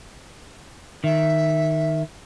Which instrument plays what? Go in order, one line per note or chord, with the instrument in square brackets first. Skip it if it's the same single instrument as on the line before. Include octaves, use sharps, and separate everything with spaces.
[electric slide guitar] D#3 [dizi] E5